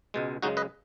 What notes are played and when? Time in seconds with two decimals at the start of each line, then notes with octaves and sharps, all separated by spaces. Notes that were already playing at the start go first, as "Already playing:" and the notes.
0.14 C#2 B2 G#3
0.42 F#2 C#3 G#3 D#4 F#4
0.57 B4 D#5